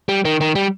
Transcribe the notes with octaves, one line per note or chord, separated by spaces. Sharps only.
G3
D#3
D#3
G3